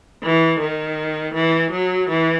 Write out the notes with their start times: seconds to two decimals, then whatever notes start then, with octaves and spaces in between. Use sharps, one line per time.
0.23 E3
0.60 D#3
1.34 E3
1.71 F#3
2.10 E3